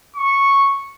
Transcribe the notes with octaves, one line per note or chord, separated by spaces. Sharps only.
C#6